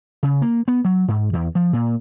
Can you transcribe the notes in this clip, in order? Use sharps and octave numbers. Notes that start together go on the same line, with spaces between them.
C#3
A#3
B3
F#3
G#2
E2
F3
A#2